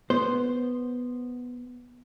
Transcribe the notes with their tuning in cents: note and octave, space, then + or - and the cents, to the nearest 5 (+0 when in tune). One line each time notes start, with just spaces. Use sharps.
B3 +0 C5 +0